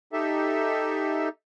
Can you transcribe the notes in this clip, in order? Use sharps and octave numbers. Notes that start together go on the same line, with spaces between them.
D#4 G4 A4 E5